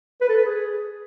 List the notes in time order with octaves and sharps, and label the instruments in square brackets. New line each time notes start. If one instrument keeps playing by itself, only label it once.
[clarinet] B4
A4
B4
G#4